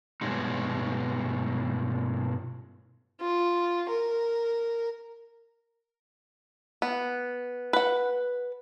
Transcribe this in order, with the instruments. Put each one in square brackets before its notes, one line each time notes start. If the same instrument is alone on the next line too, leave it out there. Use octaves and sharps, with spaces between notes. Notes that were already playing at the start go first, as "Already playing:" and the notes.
[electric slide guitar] G2 B2 F#3 G#3 D#4
[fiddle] F4
A#4
[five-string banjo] B3
B4 F#5